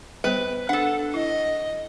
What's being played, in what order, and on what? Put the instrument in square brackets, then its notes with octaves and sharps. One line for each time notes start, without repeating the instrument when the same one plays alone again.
[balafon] G3 B3 C5 [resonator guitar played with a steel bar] B4
[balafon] D4 [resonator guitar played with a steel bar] A4 F#5
[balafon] E4 [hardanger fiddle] D#5